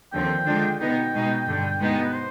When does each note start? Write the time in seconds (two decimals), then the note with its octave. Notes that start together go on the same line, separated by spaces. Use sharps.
0.13 D#2 D3 F3 C4 G5
0.46 D3 G#3 D4 F4
0.80 B2 B3 D#4 G5
1.14 B2 G#3 B3 D#4
1.47 G2 D3 G3
1.81 B2 G#3 B3 D#4
2.04 B4
2.14 C5